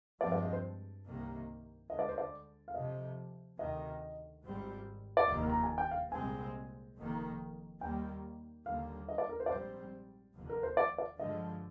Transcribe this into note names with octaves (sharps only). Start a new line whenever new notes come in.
G2 F3 G#3 C4 D5
D5
D#5
C5
C2 C3 D#3 A#3
D2 D3 G#3 D#5
D5
C5
D5
F5
F2 C3 F3 D#5
D2 C3 D#3 D#5
G#1 G#2 G3 C4
D5
F1 D#2 D#3 A#3 D#5
A#5
G#5
G5
F5
C2 A#2 G#3 C4 G#5
F1 F2 D#3 A#3
D#2 D#3 G3 A#3 G5
D#2 D3 G3 A#3 F5
D#5
D5
A#4
C5
D5
A#1 G#2 G3 C4 C5
F1 D#2 D3 F3
A#4
C5
D5
D5
G2 D3 F3 G#3 D#5